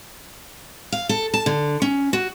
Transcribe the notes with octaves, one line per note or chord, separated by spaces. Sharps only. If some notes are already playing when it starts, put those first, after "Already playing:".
F5
A4
A5
D3
C#4
F#4